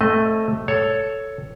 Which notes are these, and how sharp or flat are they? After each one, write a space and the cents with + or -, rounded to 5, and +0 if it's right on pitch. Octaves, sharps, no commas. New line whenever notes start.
A3 +0 C4 +35 D#5 +0
A4 +0 C#5 +5